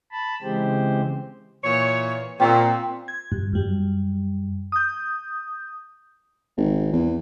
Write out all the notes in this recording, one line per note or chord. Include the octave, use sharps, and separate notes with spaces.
A5 B5
C#3 E3 G#3 C4 G4 C5
A#2 E3 C#5
A#2 C4 C#6 E6
G#6
G2
F#2 G3
D#6 G6
G#1
E2